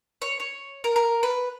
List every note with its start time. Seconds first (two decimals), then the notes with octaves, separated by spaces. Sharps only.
0.22 C#5
0.40 C#5
0.84 A#4
0.96 A#4
1.23 B4